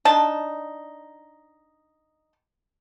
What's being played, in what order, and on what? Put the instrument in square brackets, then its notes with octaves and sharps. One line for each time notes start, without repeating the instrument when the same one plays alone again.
[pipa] D4 D#4 A5